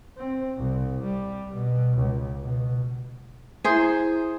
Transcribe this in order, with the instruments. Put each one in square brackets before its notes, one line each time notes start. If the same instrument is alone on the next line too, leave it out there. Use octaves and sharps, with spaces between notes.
[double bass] C4
C2
G3
B2
C#2
B2
[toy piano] E4 E5 [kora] G#4 C5